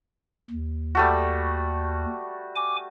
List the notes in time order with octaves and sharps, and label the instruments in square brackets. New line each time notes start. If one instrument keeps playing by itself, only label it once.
[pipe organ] D#2
[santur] G3 A3 F#4
[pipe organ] G#5 D6